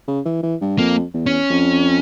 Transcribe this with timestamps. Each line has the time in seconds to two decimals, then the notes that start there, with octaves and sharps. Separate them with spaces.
0.08 C#3
0.25 E3
0.43 E3
0.61 G2
0.78 F2 A#3
1.14 E2
1.26 C#4
1.50 F2